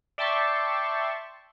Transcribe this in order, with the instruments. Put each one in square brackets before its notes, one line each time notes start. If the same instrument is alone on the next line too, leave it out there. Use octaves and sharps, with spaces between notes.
[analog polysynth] D5 E5 G5 A5 C6 C#6